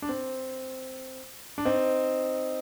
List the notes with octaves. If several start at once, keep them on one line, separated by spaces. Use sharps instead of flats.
D4
C4
D4
C4 D#4